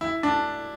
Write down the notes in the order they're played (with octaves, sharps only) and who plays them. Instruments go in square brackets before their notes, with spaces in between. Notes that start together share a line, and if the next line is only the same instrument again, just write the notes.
[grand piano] E4
D4